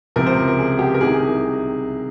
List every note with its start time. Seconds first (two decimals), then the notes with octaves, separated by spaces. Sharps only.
0.16 C#2 C3 F3 A#4
0.27 C5
0.48 A#4
0.59 G#4
0.79 G4
0.94 A#4
1.01 C2 C3 D#3 G#4
1.14 G#4